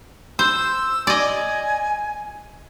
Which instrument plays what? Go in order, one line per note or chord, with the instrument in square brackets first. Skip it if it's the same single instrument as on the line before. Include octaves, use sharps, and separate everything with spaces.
[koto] C5 [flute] E6
[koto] D5 D#5 [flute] G#5